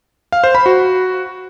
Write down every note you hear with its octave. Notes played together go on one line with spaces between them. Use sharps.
F5
C5
B5
F#4